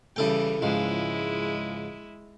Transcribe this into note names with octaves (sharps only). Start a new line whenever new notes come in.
C#3 E3 G3 E4 A4 G5
C#2 G#2 F3 G#3 E4